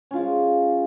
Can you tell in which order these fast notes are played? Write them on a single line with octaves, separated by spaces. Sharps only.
C#4 F4 G#3 F3